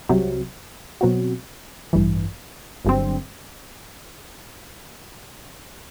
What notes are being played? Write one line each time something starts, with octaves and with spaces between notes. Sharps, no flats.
C2 C3 F#3
B2 F#3 C4 F#4
A1 G2 E3
G1 G2 D3 F#3 C4